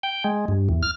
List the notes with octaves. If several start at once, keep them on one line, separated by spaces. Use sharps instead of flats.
G5
G#3
G2
E2
F6